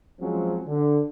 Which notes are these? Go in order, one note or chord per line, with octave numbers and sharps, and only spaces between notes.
F3 F#3 G#3 C4 C#4
D3